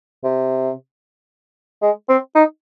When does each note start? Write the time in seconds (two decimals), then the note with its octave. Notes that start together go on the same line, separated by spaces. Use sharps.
0.24 C3
1.82 G#3
2.09 C4
2.35 D#4